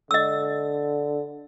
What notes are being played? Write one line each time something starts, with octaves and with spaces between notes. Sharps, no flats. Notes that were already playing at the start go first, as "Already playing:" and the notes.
D3 D#5 E6